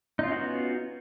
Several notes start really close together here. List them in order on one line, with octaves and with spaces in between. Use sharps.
D#4 F4 C#4 F#4 B3